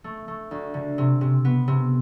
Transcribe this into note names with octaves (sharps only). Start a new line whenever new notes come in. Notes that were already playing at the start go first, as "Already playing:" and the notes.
A3
A3
D2
D3
C3
C3
B3
C3